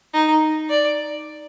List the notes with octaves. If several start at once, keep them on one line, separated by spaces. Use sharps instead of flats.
D#4
D5